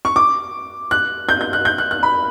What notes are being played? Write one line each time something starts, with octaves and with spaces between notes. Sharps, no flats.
C#6
D6
F#6
G6
G6
F#6
G6
F#6
F#6
B5